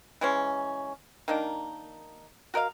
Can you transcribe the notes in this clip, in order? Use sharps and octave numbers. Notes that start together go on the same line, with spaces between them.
E3 G#3 C#4
D#3 A#3 D4 D#4
F#4 A#4 D#5 F5